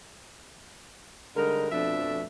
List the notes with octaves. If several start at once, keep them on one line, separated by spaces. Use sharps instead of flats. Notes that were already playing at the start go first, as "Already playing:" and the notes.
D3 G3 G#3 D#4 A#4
F2 B2 F3 A3 D4 E5